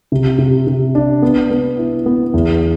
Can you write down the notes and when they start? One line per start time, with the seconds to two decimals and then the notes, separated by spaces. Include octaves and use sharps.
0.12 C3
0.38 C3
0.67 C3
0.95 D4
1.22 B3
1.51 B3
1.78 E4
2.06 B3
2.34 E2